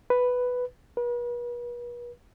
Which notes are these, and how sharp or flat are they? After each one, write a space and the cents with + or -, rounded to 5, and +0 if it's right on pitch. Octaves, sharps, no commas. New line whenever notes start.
B4 +5
B4 -40